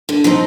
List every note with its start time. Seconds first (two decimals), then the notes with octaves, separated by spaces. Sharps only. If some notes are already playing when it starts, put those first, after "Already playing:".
0.09 D3
0.24 F3 C4 D#4